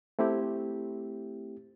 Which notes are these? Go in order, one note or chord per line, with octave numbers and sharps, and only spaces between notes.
A3 C4 E4 G4